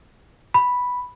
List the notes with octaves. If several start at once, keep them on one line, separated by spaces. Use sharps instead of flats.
B5